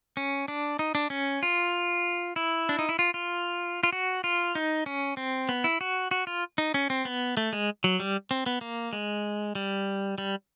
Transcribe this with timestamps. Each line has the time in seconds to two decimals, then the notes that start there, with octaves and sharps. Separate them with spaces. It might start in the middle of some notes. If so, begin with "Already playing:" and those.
0.17 C#4
0.48 D4
0.79 D#4
0.95 D4
1.10 C#4
1.43 F4
2.36 E4
2.69 D4
2.79 D#4
2.89 E4
2.99 F4
3.14 F4
3.83 F4
3.93 F#4
4.24 F4
4.55 D#4
4.86 C#4
5.17 C4
5.49 B3
5.64 E4
5.81 F#4
6.11 F#4
6.27 F4
6.58 D#4
6.74 C#4
6.90 C4
7.05 B3
7.37 A3
7.53 G#3
7.84 F#3
8.00 G3
8.31 C4
8.46 B3
8.61 A#3
8.93 G#3
9.55 G3
10.18 G3